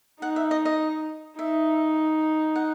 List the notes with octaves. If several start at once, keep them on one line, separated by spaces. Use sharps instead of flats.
D#4 F#5
E5
D#5
D#5
D#4 E5
F#5